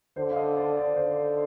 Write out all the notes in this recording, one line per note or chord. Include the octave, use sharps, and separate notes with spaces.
D3 C5
F5
D#5
D5
D5
D3 C5